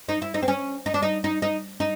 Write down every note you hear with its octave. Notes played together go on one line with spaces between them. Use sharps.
D#4
E4
D#4
C4
C#4
D#4
D4
D#4
D#4
D#4
D#4